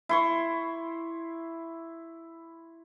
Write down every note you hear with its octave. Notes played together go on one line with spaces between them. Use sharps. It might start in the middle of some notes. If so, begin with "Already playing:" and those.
E4 C6 C#6